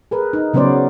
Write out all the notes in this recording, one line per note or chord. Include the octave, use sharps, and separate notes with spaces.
G#4 A#4 B4
D#4
C#3 F#3 B3 C#4 C5 D5